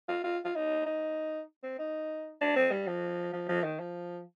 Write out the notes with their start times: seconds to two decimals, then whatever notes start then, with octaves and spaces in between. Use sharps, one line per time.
0.08 F4
0.24 F4
0.45 F4
0.55 D#4
0.86 D#4
1.63 C4
1.79 D#4
2.41 D4
2.56 C4
2.71 G3
2.87 F3
3.33 F3
3.49 F3
3.64 D#3
3.80 F3